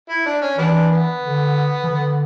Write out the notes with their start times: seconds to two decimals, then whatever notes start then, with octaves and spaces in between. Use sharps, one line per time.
0.10 E4
0.26 D4
0.42 C#4
0.58 E3 G3 B3 D4
0.90 B3
1.23 D3
1.83 E3
1.88 D3